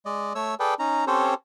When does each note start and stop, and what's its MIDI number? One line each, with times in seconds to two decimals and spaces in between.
0.05 0.33 56
0.05 0.33 74
0.05 0.33 75
0.35 0.55 57
0.35 0.55 73
0.35 0.55 88
0.60 0.74 68
0.60 0.74 69
0.60 0.74 71
0.60 0.74 74
0.60 0.74 79
0.79 1.05 61
0.79 1.05 63
0.79 1.05 82
1.07 1.34 60
1.07 1.34 61
1.07 1.34 67
1.07 1.34 69
1.07 1.34 72
1.07 1.34 73